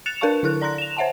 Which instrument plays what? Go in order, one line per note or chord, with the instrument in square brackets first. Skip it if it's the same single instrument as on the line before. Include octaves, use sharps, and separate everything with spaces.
[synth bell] F#6 A6 C#7 E7 F7
D4 A#4 B4 F5 A5 C#6
D3 E4 A4 A#4 F#6
D5 A#5 C6 F#6 A#6
E7 F7
C5 C#5 E5 F#5 G#5 A5